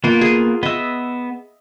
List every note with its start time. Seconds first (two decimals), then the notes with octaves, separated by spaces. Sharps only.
0.04 A#3 B3 F4
0.21 G#4
0.63 B3 D#5 E5 E6